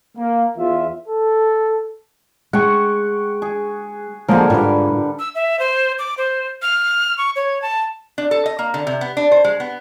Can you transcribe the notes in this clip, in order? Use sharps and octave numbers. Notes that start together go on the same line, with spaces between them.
A#3
E2 F4 E5
A4
G#3 F#5 G5 C#6
G#4
D3 F3 G#3 A#3 A#4
G#2 G3 F4 B4
E6
E5
C5
D6
C5
F6
C#6
C#5
A5
D4
A4
D#5
A#3
D3
C3
B3
D4
C5
G#3
B3